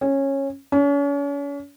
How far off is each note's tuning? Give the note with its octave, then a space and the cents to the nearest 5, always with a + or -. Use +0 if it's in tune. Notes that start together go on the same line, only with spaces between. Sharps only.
C#4 -15
C#4 +40